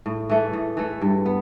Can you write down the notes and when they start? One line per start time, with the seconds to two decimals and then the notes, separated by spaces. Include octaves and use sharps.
0.06 A2
0.29 E3 A3
0.53 A2
0.77 E3 A3
1.01 G2
1.26 B3